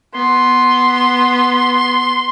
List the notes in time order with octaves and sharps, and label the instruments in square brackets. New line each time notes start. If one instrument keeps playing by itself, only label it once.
[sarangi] B3 [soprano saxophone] C6